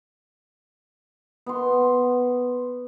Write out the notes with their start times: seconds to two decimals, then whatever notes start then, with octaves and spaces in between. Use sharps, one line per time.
1.46 B3 C6